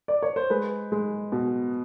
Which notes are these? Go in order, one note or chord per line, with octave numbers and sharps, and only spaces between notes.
D5
C#5
C5
G#3 B4
G#3
B2